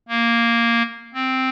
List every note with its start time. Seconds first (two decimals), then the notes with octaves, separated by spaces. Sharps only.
0.08 A#3
1.14 C4